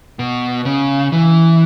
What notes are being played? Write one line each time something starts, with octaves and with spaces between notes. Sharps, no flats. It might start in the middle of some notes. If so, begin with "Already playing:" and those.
B2
C#3
E3